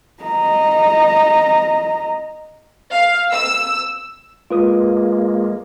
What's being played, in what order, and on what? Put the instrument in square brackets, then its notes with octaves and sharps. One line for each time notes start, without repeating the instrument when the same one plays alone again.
[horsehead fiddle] D#5 A#5
[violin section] F5
E6
[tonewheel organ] G#3 A#3 [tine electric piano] F4 B4 D#6